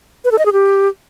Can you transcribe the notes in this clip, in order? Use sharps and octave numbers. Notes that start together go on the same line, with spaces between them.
B4
A4
D#5
G#4
G4